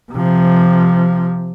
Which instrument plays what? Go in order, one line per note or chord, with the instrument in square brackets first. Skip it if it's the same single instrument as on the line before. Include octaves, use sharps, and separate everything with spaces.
[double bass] C3 F3